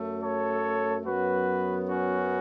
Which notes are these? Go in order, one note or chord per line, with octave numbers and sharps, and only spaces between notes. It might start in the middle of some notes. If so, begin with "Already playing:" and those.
Already playing: F#2 F#3 A3
A4 C#5
F#2 F#3 B3 F#4 B4
C#4 F#4